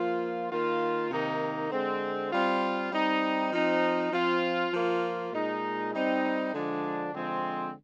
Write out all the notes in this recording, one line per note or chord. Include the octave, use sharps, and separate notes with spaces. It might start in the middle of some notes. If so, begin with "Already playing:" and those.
Already playing: F3 A#3 F4
D#3 A#3 F4
C3 D#3 A#3 D#4
D3 G#3 C4
G3 C4 F4
G3 C4 D#4
F3 C4 D#4
F3 C4 F4
F3 A#3 F4
A#2 G#3 D#4
G3 C4 D#4
D3 F3 G#3 D4
D3 F3 G#3 C4